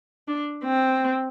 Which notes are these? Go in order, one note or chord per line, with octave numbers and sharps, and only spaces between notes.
D4
C4